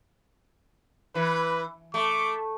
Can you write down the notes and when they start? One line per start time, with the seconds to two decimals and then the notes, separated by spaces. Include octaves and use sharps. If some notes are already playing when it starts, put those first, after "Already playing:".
1.15 E3 B4
1.94 A3 D6